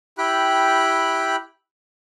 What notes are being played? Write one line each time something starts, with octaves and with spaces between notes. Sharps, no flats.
E4 G4 G5 B5 F#6